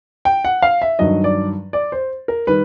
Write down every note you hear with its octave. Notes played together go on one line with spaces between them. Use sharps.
G5
F#5
F5
E5
G2 D#3 F#3 D#5
D5
D5
C5
A#4
D#3 G3 B4